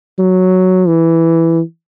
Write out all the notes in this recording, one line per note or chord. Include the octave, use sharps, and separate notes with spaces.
F#3
E3